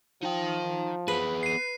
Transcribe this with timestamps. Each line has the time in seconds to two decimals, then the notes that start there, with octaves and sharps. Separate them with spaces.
0.23 F3 D#4 G5
1.08 B3 G#4 B4
1.43 C7 D#7